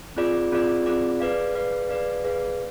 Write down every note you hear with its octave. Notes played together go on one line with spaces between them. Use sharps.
C4 F4 G#4 D5
C4 F4 G#4 D5
C4 F4 G#4 D5
G#4 B4 D5 F5
G#4 B4 D5 F5
G#4 B4 D5 F5
G#4 B4 D5 F5